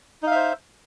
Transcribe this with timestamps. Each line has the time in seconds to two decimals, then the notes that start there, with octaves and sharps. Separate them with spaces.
0.23 D#4
0.27 F5
0.31 E5
0.36 C5